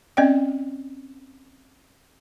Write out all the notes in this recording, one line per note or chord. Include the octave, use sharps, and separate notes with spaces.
C4 C#4 D5 D#5 G5